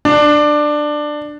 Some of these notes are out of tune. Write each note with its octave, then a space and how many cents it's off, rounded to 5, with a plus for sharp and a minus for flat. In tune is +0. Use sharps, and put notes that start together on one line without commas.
D4 +15